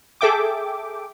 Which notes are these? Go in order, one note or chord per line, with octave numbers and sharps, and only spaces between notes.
G#4 A4 E5 G5 D6